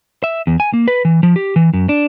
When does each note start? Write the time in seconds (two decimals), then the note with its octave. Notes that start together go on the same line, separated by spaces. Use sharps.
0.24 E5
0.47 E2
0.60 G#5
0.73 A#3
0.88 B4
1.05 E3
1.23 F3
1.36 G4
1.56 E3
1.74 F#2
1.89 D4